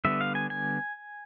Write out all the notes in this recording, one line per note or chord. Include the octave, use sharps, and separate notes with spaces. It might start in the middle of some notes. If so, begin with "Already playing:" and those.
D3 G3 B3 E5
F5
G#5
G#5